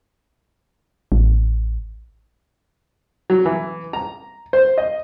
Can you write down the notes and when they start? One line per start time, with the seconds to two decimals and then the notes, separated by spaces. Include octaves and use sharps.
1.12 A1
3.30 F#3
3.46 E3
3.93 A#5
4.53 C5
4.78 D#5